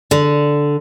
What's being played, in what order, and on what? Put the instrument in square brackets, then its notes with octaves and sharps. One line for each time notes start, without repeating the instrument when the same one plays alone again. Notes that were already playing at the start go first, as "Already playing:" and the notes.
[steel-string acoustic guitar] D3